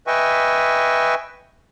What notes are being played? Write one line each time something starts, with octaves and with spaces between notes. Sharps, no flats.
B4 D#5 E5 G5 G#5 C#6